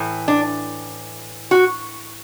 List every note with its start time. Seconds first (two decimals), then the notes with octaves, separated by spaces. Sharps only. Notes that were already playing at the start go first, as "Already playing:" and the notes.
Already playing: A2 E3
0.28 D4
1.51 F#4